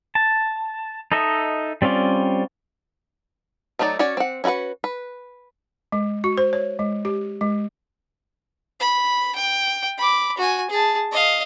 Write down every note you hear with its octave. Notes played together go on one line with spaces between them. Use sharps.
A5
D#4 A4 D#5 E5
G3 C4 C#4 F4 D5
F#3 A3 D#4 E4 D5
C#4 F#4 C#5 D5
C4 F#5
C#4 E4 F#4 B4 F#5
B4
G#3
F#4
C5
C#5
G#3
G4
G#3
B5
G5
B5 D6
F#4 G#5
G#4 A5
D#5 F5